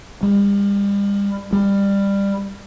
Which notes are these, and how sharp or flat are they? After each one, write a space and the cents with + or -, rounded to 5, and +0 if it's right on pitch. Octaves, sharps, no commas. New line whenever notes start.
G3 +40
G3 +20